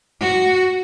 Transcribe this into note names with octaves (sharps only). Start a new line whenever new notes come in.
F#4